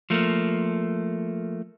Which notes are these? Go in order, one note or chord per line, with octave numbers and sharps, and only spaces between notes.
F3 A3 A#3